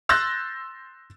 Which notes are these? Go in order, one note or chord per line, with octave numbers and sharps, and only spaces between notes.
C6 E6 F#6 G6 A6 A#6